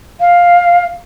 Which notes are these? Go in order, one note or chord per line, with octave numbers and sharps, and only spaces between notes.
F5